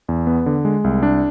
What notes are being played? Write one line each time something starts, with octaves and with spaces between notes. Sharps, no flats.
E2
B3
D3
G#3
C2
D4